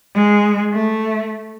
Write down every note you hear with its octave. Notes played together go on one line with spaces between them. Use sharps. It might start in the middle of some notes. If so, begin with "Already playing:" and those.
G#3
A3